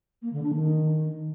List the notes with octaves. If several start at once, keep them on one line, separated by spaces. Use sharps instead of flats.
A#3
D3
D4
D#3